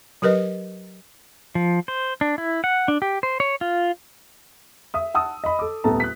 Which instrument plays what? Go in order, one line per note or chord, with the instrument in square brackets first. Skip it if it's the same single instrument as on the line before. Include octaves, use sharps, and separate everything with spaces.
[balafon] F#3 G4 A#4 B4 D#5
[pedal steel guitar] F3
C5
D4
E4
F#5
D4
G4
C5
C#5
F4
[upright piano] E5 D#6
F#5 A5 D#6 E6
D#5 B5
A4 D6
D#1 A#1 A3 B3 A5 A#5
F#6 B6